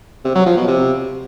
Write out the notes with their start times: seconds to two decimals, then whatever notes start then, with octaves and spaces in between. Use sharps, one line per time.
0.24 C3
0.35 F#3
0.46 F3
0.57 B2
0.68 C3